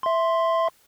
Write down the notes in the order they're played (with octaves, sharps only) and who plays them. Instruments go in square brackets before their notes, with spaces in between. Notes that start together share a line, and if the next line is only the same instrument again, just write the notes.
[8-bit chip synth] E5 C6